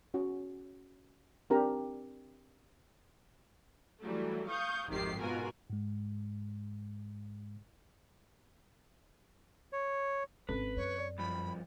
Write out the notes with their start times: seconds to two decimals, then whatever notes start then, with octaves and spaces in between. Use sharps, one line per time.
0.14 C#4 F#4
1.50 C4 D4 G4 A#4 A#5
4.01 E3 F#3 G3 A3
4.48 F5 C#6 D#6 G6
4.88 G#1 F2 C3 D#3 G4 C7
5.19 G#2 B2 F4 F#4 A#4 G#5
5.70 G#2 G#3
9.73 C#5
10.49 G#1 C4 C#4 A4 B4
10.77 F#2 C#5
10.98 D5
11.18 G2 F3 B5